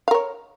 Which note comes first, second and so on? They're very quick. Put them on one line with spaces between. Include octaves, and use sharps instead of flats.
F5 A#4 C#5